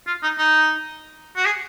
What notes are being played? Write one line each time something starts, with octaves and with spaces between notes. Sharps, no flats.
F4
D#4
D#4
F#4
G#4